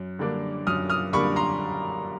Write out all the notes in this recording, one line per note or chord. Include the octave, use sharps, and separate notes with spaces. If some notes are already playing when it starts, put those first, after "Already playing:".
Already playing: F#2
D3 G3 A#3 D4
F#2 D#6 F6
D#6 F6
D3 G3 A#3 D4 B5 C#6
A#5 C6